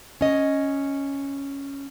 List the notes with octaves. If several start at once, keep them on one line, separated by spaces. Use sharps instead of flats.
C#4 D#5